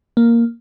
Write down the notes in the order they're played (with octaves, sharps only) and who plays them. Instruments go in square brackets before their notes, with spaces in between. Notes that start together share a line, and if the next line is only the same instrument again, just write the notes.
[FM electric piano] A#3